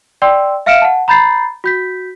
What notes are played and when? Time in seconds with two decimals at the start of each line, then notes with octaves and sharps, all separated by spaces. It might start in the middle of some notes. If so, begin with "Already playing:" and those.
0.22 D5 G5 C6 E6
0.66 E5 F5 F6 C#7 D7 E7
0.82 F#5 A5
1.08 A#5 B5 G6 A6 C7
1.64 F#4 G6 B6